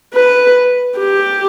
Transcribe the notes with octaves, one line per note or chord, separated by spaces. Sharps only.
B4
G4